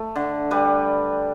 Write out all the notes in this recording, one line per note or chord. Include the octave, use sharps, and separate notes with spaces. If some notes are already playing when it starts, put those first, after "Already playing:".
Already playing: A3
D3
G3 B4